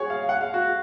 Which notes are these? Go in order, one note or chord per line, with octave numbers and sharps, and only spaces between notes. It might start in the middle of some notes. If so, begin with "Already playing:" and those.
Already playing: F#4 G#4 C#5
F5
F#5
F5
F#4